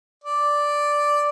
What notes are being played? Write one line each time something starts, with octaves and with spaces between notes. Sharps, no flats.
D5